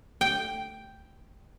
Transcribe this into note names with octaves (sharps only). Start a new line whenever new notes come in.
G5